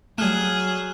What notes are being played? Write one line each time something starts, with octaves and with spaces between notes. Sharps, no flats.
F#3 G3 A3 G#4 F6 F#6 E7